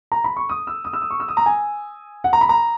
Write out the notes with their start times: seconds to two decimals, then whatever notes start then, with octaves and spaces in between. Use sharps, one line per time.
0.12 A#5
0.24 B5
0.37 C#6
0.49 D#6
0.67 E6
0.85 D#6
0.93 E6
1.02 D#6
1.10 C#6
1.20 E6
1.28 D#6
1.37 A#5
1.46 G#5
2.24 F#5
2.33 A#5
2.41 B5
2.49 A#5